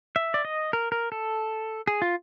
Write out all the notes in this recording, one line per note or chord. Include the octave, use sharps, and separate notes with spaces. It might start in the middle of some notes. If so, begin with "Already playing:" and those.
E5
D5
D#5
A#4
A#4
A4
G#4
F4